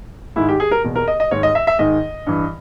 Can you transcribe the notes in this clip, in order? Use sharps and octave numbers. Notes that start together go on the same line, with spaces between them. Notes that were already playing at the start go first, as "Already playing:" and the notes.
G#2 D#3 E4
G4
G#4
A#4
E2 B2
A#4
D#5
D#5
G#2 D#3 C#5
D#5
E5
E5
G#2 D#3 D#5
G2 E3